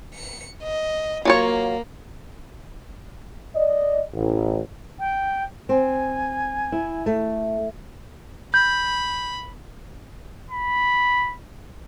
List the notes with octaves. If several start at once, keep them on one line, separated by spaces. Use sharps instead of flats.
C#7
D#5
F#3 A#3 F4 C#5
D5 D#5
A1
G5
C4 G#5
E4
A3
B5 G6
B5